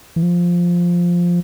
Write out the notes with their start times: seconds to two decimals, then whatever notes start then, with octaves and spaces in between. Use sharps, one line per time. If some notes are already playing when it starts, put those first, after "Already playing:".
0.16 E3
0.23 F3